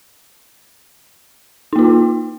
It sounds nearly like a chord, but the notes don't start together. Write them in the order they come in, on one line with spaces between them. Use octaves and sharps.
D#4 A#3 F4